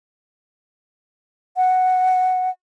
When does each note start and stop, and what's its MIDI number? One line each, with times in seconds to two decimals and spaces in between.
1.57 2.50 78